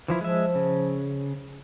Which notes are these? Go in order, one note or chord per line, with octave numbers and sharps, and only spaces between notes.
E3 F3 E4
F3 G#3 E5
C#3